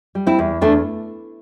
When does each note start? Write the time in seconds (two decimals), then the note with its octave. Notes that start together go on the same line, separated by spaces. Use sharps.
0.15 G3
0.27 C4 E4
0.39 E2
0.61 E2 A3 D4